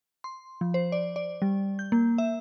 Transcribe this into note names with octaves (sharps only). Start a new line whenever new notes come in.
C6
F3
C5
D5
D5
G3
G6
A#3
E5